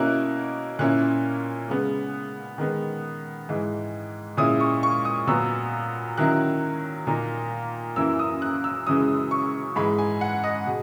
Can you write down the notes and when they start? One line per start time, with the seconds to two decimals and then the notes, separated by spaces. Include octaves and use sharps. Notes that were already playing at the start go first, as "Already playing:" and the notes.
Already playing: B2 A#3 C#4 E4 F#6
0.79 A#2 A#3 C#4 E4 F#6
1.69 C#3 G#3 B3
2.58 D#3 G#3 B3
3.48 G#2 E3 G#3
4.37 A#2 G#3 C#4 E4 D#6
4.60 C#6
4.83 C#6
5.05 D#6
5.27 A#2 F#3 B3 E6
6.17 D#3 F#3 C#4 E4 F#6
7.07 A#2 A#3 D#4
7.96 F#2 E3 A#3 E4 E6
8.19 D#6
8.42 F#6
8.64 E6
8.87 F#2 C#3 E3 G#3 D#6
9.31 C#6
9.76 G#2 E3 G#3 B5
9.99 G#5
10.21 F#5
10.44 D#5
10.67 B2 G#3